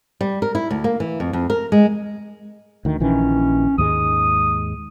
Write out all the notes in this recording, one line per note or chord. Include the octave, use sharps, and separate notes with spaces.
G3
A#4
E4
D2
A#3
E3
F2
F2
A#4
G#3
D2 D#3
A#1 D#3 E3 C#4
D#2 G#2 G#3 D#6